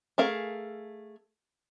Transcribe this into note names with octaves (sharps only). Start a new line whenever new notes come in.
A3 G#4 A#4 F5